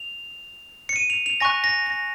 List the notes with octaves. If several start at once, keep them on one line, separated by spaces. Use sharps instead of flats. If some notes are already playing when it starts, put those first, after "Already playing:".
Already playing: F7
C#7
D#7
F7
F7
G#5 C#6 F#6 A#6
A#6
A#6